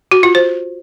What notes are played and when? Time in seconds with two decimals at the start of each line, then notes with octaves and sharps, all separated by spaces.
0.11 F#4
0.23 F4
0.35 C5